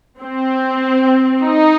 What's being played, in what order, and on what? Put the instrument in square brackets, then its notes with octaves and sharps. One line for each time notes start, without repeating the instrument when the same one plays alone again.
[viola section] C4
D#4